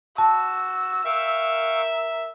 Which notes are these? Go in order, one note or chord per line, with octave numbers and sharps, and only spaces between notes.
F#4 A5 E6
A#4 E5 F5 G5 C#6